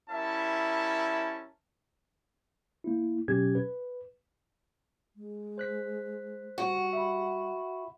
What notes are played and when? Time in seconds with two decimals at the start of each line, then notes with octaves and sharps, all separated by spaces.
0.10 G3 C#4 E4 A#4 E5 A5
2.84 A#3 E4
3.28 B2 F#3 C#4 G4 G#6
3.55 B4
5.16 G#3
5.58 C5 F#6 B6
6.58 G3 F#4
6.93 E5 B5